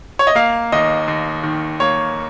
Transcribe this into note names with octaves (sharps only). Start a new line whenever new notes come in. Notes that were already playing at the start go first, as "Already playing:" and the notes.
C#5
D#5
A#3 F5
D#2 D#5
D#2
D#3
A#3 C#5